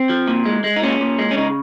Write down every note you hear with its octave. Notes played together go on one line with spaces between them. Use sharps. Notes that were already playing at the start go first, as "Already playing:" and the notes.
Already playing: C4
F3
A#2
G#3
G#3
D#4
A#2 C#4
A#2
G#3
C#4
C#3 D#4